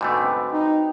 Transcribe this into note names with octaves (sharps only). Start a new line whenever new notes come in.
G#2 B2 D3 G3 A3 G4
C4 B4
D#4